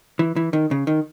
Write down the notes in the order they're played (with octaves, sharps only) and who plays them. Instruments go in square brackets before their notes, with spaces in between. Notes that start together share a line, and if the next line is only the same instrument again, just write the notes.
[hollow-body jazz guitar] E3
E3
D#3
C#3
D#3